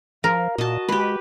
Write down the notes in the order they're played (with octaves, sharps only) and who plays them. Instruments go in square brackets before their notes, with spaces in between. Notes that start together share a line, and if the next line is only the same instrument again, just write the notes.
[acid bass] F3 [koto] A#4 [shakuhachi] F5
[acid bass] A#2 [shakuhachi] F#4 [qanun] D#5 A5
[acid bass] G#3 [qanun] G4 B4